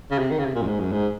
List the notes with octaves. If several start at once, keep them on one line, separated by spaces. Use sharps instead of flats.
C#3
C3
D#3
C#3
C3
A#2
F#2
G#2
F#2
G#2